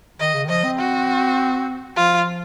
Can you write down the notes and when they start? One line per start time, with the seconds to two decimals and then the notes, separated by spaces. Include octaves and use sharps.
0.20 D#3 D#5
0.34 C#3
0.45 D#3
0.49 F3 D#5
0.64 C4
0.79 F#4
1.96 F3 F4